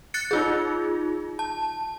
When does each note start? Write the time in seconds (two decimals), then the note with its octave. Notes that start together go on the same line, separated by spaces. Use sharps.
0.14 F#6 A6 C#7
0.31 D#4 F4 G#4
1.39 A5